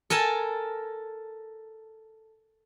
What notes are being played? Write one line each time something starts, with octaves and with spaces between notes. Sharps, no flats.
A4 A#4 G#5 A5